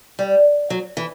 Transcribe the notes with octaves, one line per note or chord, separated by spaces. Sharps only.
G3
F#3
E3